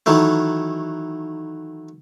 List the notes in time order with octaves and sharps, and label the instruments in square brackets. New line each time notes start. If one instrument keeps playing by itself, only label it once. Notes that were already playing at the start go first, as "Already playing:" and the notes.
[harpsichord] D#3 E3 F#3 A3